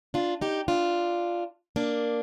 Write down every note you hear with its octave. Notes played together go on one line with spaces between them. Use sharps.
D4 F4
D#4 G4
D4 F4
A#3 D4